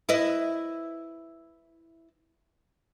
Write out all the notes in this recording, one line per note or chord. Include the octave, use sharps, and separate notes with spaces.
E4 B4 D#5